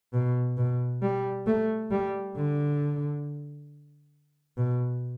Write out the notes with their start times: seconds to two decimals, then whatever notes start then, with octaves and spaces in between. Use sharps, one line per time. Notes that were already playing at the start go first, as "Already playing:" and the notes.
0.14 B2
0.57 B2
1.03 G3
1.47 A3
1.91 G3
2.36 D3
4.57 B2